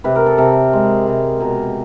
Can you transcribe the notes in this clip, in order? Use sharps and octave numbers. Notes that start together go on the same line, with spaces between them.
C3 B4
A#4
A4
C3 A#4
G#3
C3
B2 A#4